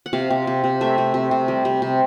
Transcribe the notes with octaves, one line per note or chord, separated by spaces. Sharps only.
F#5
C3 F5
C3
C3
C3
A3 E5
C3
C3
C3
G3
C3
C3